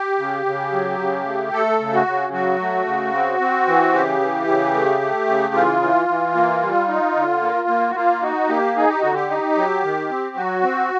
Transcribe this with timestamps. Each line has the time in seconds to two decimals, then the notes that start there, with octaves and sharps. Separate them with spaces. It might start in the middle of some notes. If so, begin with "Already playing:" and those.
Already playing: G4
0.19 C#3
0.46 C#3
0.72 F#3
0.99 C#3
1.25 A3
1.53 A3 A4
1.80 C#3
1.94 F#4
2.06 C#3
2.33 F#3 F#4
2.60 A3
2.86 C#3
3.14 C4
3.40 C4
3.67 E3
3.93 C#3 G4
4.20 E3
4.47 C#3
4.74 A3
5.01 A3
5.28 C#3
5.54 E3 F4
5.82 E3
6.09 E3
6.35 A#3
6.62 G3
6.88 D#4
7.16 D3
7.42 A#3
7.69 A#3
7.90 F#4
7.95 A#3 F4
8.22 D#4 F#4
8.49 A#3 G4
8.76 D#4 G#4
8.89 G4
9.02 D3 F#4
9.14 G4
9.30 D#4
9.56 F#3
9.83 D#3
10.10 C4
10.36 F#3 F#4
10.63 C4